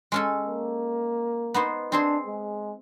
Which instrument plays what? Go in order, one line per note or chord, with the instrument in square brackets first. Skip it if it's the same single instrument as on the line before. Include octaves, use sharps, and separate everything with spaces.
[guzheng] G#3 C#4 A4
[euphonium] A#3
[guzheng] B3 D#4 C5
[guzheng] C4 G#4 C5 [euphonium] D4
[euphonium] G#3